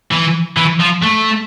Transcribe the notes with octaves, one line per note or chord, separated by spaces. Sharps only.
E3
E3
F3
A3